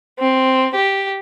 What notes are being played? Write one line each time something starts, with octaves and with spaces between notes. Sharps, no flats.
C4
G4